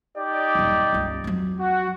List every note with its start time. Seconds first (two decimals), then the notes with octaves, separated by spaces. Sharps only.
0.18 D#4 G4 D5
0.55 D#1 F#2
0.93 G1 C#2
1.24 F2 F#3
1.60 F#4